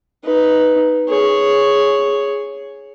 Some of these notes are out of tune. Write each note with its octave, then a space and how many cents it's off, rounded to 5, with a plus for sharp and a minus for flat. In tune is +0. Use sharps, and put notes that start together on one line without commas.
D#4 +0 B4 +0
G#4 +0 C#5 +0